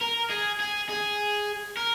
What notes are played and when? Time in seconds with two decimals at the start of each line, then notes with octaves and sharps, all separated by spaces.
0.01 A#4
0.30 G#4
0.60 G#4
0.89 G#4
1.77 A#4